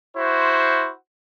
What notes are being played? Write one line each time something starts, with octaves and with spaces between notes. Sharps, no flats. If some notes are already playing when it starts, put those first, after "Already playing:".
E4 F#4 C5